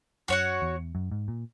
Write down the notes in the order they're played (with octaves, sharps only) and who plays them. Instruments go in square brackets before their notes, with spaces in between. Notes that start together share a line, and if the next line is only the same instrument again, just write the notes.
[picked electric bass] F#2 [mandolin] F#4 C#5 F#5
[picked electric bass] E2
F#2
G#2
A#2